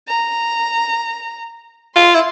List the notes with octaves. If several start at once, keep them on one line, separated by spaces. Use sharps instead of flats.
A#5
F4 C6
E4